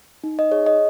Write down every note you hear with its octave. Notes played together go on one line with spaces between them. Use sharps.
D#4
D#5
G#4 C#5
D#5